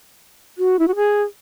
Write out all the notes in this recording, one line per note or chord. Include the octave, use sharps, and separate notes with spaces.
F#4
E4
F#4
G#4